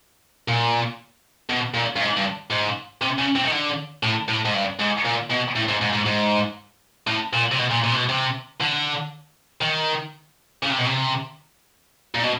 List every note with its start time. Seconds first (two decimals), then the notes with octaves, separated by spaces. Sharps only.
0.48 A#2
1.50 B2
1.74 A#2
1.96 G2
2.01 G#2
2.17 G2
2.51 G#2
3.02 C3
3.19 C#3
3.36 C3
3.46 D#3
3.52 D3
4.03 A2
4.29 A2
4.45 G#2
4.54 G2
4.79 G#2
5.05 A#2
5.30 B2
5.56 A2
5.68 G#2
5.81 G#2
5.93 G#2
6.06 G#2
7.07 A2
7.33 A#2
7.52 C3
7.59 B2
7.71 A#2
7.84 A#2
7.92 C3
7.96 B2
8.09 C3
8.60 D3
9.61 D#3
10.63 C#3
10.71 C3
10.79 B2
10.85 C3
12.15 A#2
12.23 B2